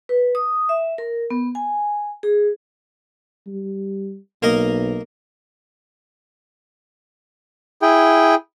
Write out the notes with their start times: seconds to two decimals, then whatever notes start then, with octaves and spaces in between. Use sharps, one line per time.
0.09 B4
0.35 D#6
0.69 E5
0.98 A#4
1.30 B3
1.55 G#5
2.23 G#4
3.47 G3
4.43 B1 A#3 A#4 D#5
7.82 E4 G#4 G5